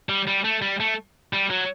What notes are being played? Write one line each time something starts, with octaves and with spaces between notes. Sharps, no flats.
G3
G3
A3
G3
A3
G3
F#3